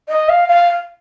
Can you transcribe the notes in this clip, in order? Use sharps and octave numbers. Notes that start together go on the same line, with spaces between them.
D#5
F5
F5